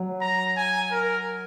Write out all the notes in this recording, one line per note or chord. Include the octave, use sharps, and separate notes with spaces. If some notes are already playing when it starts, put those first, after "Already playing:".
Already playing: F#3
A#5
G#5
A#4